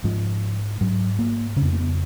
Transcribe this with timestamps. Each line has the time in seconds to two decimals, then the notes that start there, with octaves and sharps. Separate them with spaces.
0.04 G#2 F3
0.81 G#2 F#3
1.19 A#3
1.56 C#3 C#4
1.62 F2 B3
1.72 A#3
1.80 B3